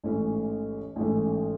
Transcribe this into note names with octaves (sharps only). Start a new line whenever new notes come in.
A1 G#2 E3 A3 C#4
A1 G#2 E3 A3 C#4